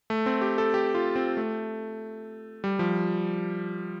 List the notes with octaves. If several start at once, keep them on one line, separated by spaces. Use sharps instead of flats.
A3
C4
G4
A4
G4
F4
C4
A3
G3
F3